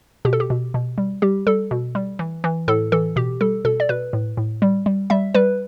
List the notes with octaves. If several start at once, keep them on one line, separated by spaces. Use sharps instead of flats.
B2 G4
A4
G4
B2
B2
G3
G3 G4
G3 A4
B2
G3
E3
E3
A2 A4
E3 A4
B2 G4
G3 A4
B2 A4
D5
B2 B4
A2
A2
G3
G3
G3 E5
G3 B4